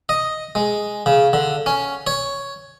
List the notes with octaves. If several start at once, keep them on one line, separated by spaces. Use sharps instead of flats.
D#5
G#3
C#3
D3
C#4
C#5